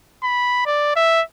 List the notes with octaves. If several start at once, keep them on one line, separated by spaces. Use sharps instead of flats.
B5
D5
E5